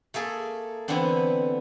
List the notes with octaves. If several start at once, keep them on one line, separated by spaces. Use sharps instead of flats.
A3 A#3 G#4 A4
D3 E3 B3 C4 D4